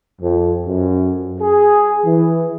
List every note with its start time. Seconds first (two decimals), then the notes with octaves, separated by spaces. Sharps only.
0.21 F2
0.66 F#2
1.41 G#4
2.05 E3